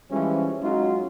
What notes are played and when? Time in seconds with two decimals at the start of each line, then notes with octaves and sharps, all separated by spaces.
0.11 E3 F3 G3 G#3 C#4
0.62 F#3 G#3 C#4 D#4 F4 F#4